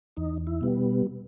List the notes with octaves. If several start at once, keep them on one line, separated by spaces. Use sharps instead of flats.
E2 D#4
E4
B2 G3 B3